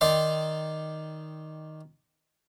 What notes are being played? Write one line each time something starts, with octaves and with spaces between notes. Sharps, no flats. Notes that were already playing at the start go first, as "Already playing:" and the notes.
D#3 D#4 D5 G5 C6